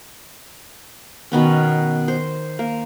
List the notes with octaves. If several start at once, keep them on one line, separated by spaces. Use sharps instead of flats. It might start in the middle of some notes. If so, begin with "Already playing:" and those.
B2 D#3 B3 C#4
C5
A#3